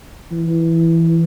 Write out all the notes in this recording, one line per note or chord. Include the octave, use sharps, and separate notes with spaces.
E3